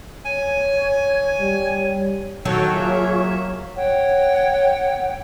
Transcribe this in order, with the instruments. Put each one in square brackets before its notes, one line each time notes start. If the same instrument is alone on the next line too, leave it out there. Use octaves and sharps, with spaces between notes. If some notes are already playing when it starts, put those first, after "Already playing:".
[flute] C#5 [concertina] G#5
[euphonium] G3
[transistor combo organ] D#3 [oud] F#3 [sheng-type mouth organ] F#4 A4 G5 [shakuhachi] C#5
[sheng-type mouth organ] A#3 E5 [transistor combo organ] F4 G#4
[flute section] C#5 F#5 G5